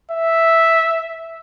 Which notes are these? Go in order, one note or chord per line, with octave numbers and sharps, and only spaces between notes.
E5